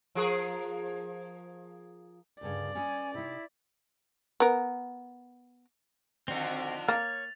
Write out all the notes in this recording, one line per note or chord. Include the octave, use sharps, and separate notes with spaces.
F3 G#4 A#4
D2 G2 C#3 D5
C#4 B4 D#5 G#5
C3 D#4 E4
B3 A#4
F2 D3 D#3 C4 F#4 F7
A#3 C#5 F6 A6